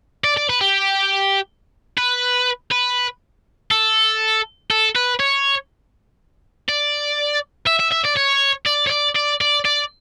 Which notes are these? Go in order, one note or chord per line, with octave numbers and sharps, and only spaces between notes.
D5
D5
B4
G4
B4
B4
A4
A4
B4
C#5
D5
E5
E5
E5
D5
C#5
D5
C#5
D5
D5
D5
D5